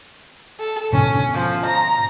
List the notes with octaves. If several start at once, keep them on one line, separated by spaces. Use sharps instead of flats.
A4
G#2 B2 D3 C#4
F3
A#5